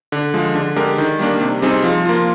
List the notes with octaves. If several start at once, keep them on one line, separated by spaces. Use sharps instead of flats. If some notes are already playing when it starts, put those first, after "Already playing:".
D3
F3 G#3
D3
G#3 D4 G4 A#4
D#3
G3 A#3 D4
C3
G3 C4 D#4 G#4
F3
A#3 F4